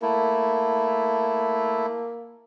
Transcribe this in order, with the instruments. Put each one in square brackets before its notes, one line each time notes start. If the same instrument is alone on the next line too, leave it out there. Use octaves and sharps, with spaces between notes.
[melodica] A3 E4 [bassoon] A#3